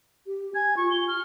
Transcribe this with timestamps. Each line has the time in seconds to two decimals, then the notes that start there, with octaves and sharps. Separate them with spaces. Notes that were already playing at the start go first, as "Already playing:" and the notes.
0.27 G4
0.55 G#5 G#6
0.77 F4 C#6
0.91 G7
1.08 F6